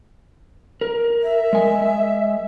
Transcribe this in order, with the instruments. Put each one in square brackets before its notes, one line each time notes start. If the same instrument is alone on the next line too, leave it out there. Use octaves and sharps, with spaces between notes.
[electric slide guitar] A#4
[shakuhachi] E5
[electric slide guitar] G#3 G#5